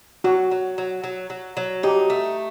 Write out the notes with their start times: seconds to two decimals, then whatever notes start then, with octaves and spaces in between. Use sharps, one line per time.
0.24 F#3 F#4
0.51 F#3
0.78 F#3
1.04 F#3
1.30 F#3
1.57 F#3
1.83 D#4 G4
2.10 A3